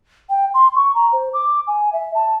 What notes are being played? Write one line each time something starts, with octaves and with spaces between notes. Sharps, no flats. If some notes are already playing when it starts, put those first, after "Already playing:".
G5
C6
C#6
A#5
C5
D6
G#5
E5
A5